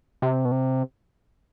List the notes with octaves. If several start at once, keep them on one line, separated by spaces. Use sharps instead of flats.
C3
B2
C3